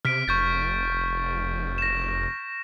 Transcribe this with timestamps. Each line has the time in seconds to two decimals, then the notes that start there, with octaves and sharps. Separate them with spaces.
0.05 C3 F6 B6 D7
0.28 F1 C#6 G6 A6
1.78 A#6 E7